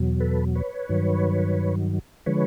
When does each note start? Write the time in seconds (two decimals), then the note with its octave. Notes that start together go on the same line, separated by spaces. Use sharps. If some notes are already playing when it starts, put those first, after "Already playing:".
Already playing: E2 B2 F#3
0.20 A4 B4
0.55 B4 C#5
0.89 G2 D#3 F#3
2.26 D3 F3 G#3 B4 C#5